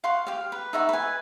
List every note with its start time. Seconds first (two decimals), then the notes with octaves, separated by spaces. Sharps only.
0.04 F5 F#5 C6 C#6
0.27 G4 F5
0.52 B4
0.73 D#4 E5 F#5 C#6
0.89 B4 G#5